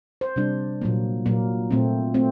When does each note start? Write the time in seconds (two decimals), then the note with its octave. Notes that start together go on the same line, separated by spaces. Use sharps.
0.21 C5
0.36 C3 G3 D4
0.81 A#2 F#3 A#3
1.26 A#2 F#3 A#3
1.71 A#2 A3 C4
2.14 A3 C4